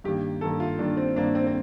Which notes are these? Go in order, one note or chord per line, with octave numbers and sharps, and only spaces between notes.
G2 D#3 A#3 G4
G2 D#3 A#3 A4
F4
G2 D#3 A#3 D4
C4
G2 D#3 A#3 D4
C4
C4